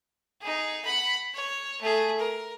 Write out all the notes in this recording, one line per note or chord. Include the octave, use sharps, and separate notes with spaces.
D#4 G#4
F#5 B5
C#5
A3 G#4
A#4